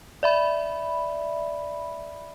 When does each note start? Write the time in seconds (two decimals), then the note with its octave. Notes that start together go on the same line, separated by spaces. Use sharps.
0.23 D5 E5 B5